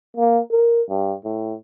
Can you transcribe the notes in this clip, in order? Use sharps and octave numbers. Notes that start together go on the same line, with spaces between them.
A#3
A#4
G2
A2